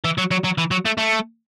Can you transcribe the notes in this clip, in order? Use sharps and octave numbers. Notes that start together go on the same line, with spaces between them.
E3
F#3
F#3
F#3
E3
F#3
A3
A3